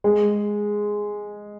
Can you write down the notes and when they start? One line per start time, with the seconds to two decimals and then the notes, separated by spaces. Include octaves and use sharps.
0.04 G#3